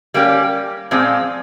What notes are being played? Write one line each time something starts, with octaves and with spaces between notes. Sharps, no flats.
G3 A#3 C#4 G4
A#2 F3 G#3 C4